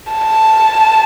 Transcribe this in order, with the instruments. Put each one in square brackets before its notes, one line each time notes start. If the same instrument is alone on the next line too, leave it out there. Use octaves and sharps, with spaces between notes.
[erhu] A5